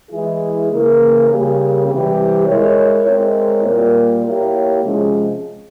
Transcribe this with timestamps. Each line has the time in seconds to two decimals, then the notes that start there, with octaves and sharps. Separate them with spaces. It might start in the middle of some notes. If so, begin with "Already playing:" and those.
0.11 E3 G#3 E4 G#4
0.69 C#3 E3 A#3
1.28 C#3 G3 A#3 C#4 G4
1.88 C3 E3 G3 C4 G4
2.46 G#3 E4 A#4 C#5
3.05 G#3 C4 E4 A#4 C#5
3.64 A#2 G3 A#3
4.23 A#3 E4 G4 C#5
4.82 C3 F3 G#3 C#4